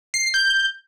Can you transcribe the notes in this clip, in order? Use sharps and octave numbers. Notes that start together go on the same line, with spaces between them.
C7
G6